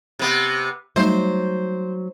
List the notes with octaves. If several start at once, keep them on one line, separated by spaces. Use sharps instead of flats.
C3 B3
F#3 G3 A3 D#4 C5